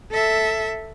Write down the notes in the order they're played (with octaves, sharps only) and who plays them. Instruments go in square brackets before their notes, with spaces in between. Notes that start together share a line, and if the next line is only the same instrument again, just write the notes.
[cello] A4 E5